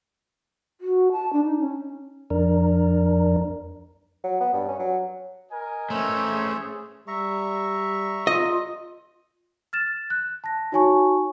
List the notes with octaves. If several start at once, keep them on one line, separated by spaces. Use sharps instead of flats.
F#4
A5
D4
D#4
C#4
F2 D4 A#4
F#3
B3
G2
C#4
F#3
A#4 D#5 G#5
A3 C#4 C5 C#5 E5
G#4
G3 E5 A#5 C#6
F4 D#5
F6 A6 E7
F#6
A5 A#6
D#4 F#4 C#5 G#5 A5 C#6